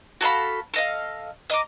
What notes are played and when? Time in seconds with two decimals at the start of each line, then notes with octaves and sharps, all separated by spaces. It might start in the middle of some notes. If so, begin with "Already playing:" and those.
0.21 F#4 A4 F5 B5
0.74 A4 D#5 F5
1.50 D#5 A#5 D6